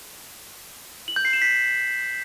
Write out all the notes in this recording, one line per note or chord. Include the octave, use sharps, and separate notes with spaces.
F#7
G6
C7
E7
B6